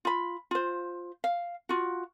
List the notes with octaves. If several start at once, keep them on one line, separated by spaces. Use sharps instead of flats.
F4 B5
F4 C5
F5
F4 F#4